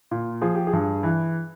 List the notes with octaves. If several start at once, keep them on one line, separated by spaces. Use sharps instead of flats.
A#2
F3 G#4
G4
G#4
G2
E3